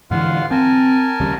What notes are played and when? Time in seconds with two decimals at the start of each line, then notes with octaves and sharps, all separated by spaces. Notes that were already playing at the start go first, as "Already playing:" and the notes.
0.11 G#2 D3 E3 F4 F5 F#5
0.51 C4 A#4 G#5 A5
1.20 D#2 C#3 G3